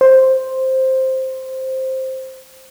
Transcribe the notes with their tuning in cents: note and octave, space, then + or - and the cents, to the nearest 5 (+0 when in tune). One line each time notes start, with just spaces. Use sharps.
C5 +5